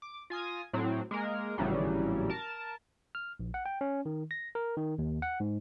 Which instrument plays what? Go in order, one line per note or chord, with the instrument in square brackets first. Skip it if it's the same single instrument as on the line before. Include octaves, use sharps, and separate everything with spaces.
[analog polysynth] D6
F4 G#5 D#6 A#6
A2 F#3 C4
G#3 A#3 A#4
G#1 A2 C#3 E3 F#3 G3
A#4 A5
[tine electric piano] F6
A#1
F#5
G5
C#4
D#3
A#6
A#4
D#3
D#2
F#5
G#2